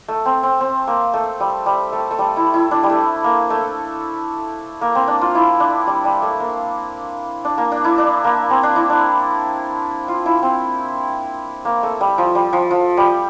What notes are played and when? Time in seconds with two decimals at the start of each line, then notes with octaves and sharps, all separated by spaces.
0.08 A3
0.26 C4
0.43 C4
0.61 C4
0.87 A#3
1.14 A3
1.40 G3
1.66 G3
1.92 A3
2.11 A3
2.19 G3
2.37 E4
2.54 E4
2.71 D4
2.83 G3
2.90 A3
3.24 A#3
3.50 A3
4.81 A#3
4.95 C4
5.08 D4
5.21 F4
5.35 E4
5.60 D4
5.87 G3
6.05 G3
6.22 A3
6.40 A#3
7.45 D4
7.58 A#3
7.72 D4
7.84 E4
7.98 D4
8.24 A#3
8.50 C4
8.63 D4
8.76 E4
8.90 D4
10.08 F4
10.26 E4
10.42 C4
11.65 A#3
11.83 A3
12.01 G3
12.18 F3
12.35 G3
12.53 F3
12.71 F3
12.97 G3